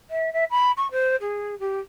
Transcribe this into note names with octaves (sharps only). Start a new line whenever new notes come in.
E5
E5
B5
C#6
C5
G#4
G4